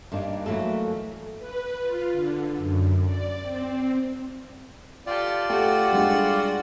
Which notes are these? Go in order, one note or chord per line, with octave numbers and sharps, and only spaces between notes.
G2 A#3 D4 D#4
E3 F#3 A3 A#3 A4
B4
F4
D3
F#2
D5
C4
F4 G4 A4 D5
A3 F#4 G4 F#5
G3 G#3 D4